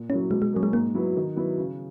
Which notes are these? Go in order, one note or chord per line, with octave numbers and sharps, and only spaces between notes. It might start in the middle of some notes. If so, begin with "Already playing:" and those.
Already playing: A#2
F#3 A#3 C#4 E4
B2 G#3
G#3
F#3 A#3 C#4
G#3
G#2 A#3
F#3 B3 E4
D#3
F#3 B3 E4
C#3